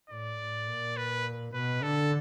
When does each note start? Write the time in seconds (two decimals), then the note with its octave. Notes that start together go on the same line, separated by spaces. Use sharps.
0.10 A2 D5
0.39 A2
0.68 A#2
0.97 B4
1.53 B2 B4
1.83 D3 A4